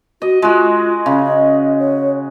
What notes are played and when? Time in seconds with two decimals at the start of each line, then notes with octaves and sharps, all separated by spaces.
0.22 F#4 D#5
0.42 G#3 F4 F#4
1.06 C#3
1.26 D#5
1.79 C#5